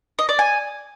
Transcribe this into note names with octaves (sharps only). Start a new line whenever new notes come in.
D#5
D5
G#5